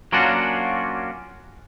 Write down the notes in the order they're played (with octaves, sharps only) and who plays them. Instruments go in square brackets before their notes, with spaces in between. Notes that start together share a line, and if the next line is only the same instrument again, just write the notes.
[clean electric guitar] F#3 A#3 C#4 D4 F4 F#4